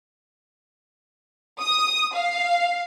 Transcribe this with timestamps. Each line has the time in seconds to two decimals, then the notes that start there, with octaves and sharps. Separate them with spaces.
1.61 D#6
2.14 F5